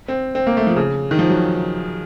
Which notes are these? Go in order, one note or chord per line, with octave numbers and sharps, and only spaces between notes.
C4
C4
A#3
A3
F3
C#3
D#3
F3
F#3